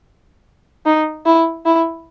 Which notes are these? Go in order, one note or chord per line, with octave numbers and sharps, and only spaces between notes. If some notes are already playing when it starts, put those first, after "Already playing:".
D#4
E4
E4